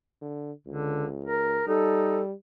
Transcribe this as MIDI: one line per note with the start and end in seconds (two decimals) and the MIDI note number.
0.22 0.52 50
0.67 1.62 37
0.67 1.05 50
1.24 1.63 70
1.67 2.33 55
1.67 2.21 63
1.67 2.22 69